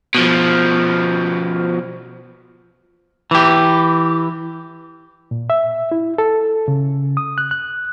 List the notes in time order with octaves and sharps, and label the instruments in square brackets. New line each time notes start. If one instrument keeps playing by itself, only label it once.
[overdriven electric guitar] B2 F3
[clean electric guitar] E3 G4
[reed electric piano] A#2
E5
E4
A4
C#3
D#6
F#6
F#6